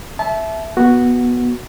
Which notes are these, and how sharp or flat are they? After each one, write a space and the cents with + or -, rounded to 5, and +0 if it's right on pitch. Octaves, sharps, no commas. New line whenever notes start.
E5 +0 A5 -30
B3 -15 F#4 +0